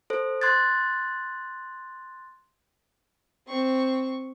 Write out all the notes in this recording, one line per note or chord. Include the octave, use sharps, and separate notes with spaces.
A4 C5
C6 F#6 G#6 A6
C4 C#6